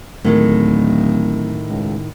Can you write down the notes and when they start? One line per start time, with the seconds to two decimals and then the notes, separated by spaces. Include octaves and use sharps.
0.24 D1 A2 D#3 G#3
1.69 C#2